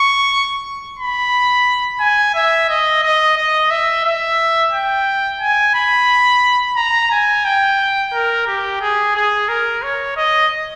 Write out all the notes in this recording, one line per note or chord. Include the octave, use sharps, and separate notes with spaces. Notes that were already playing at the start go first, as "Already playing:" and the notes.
Already playing: C#6
B5
G#5
E5
D#5
D#5
D#5
E5
E5
G5
G#5
B5
A#5
G#5
G5
A#4
G4
G#4
G#4
A#4
C#5
D#5